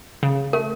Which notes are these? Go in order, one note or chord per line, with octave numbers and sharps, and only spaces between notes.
C#3
A3 A#4